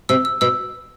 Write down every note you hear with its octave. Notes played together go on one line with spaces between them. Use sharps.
C3 E6
E6
B2 E6